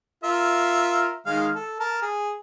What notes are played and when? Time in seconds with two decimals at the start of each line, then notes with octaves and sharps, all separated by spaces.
0.24 F4 A#4 E5
1.26 D#3 G#3 F5
1.55 A4
1.80 A#4 A5
2.02 G#4